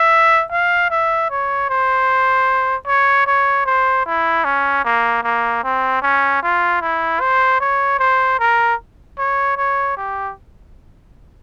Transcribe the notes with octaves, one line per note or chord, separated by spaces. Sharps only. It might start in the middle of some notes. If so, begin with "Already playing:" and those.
Already playing: E5
F5
E5
C#5
C5
C#5
C#5
C5
E4
C#4
A#3
A#3
C4
C#4
F4
E4
C5
C#5
C5
A#4
C#5
C#5
G4